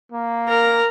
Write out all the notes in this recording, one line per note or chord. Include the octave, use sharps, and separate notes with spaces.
A#3
A#4